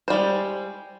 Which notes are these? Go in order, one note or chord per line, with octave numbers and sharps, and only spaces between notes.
G3 G#3 C5